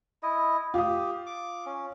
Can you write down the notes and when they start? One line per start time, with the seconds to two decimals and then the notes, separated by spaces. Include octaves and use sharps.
0.23 E4 D#5
0.74 F4 G4 D#6
1.26 D6
1.66 C#4